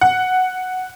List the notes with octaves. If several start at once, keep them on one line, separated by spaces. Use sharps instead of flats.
F#5